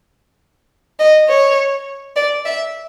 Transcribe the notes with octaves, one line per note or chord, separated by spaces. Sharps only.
D#5
C#5
D5
E5